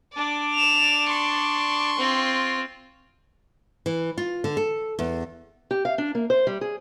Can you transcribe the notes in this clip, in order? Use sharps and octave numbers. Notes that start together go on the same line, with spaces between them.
D4 D5
E7 F7
C6 C#6
C4 F4
E3
F4
D3
A4
E2
G4
F5
D4
A#3
C5
G3
G#4